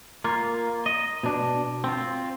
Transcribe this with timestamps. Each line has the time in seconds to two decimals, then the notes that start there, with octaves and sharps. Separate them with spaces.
0.24 A#3 F4
0.86 D#5
1.23 B2 D4
1.84 C4 F4